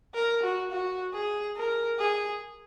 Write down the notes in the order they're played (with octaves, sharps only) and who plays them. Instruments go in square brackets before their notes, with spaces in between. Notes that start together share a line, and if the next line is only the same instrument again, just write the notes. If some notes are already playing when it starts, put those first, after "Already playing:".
[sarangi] A#4
F#4
F#4
G#4
A#4
G#4